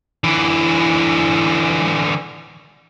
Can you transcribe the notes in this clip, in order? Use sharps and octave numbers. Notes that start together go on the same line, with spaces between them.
D3 E3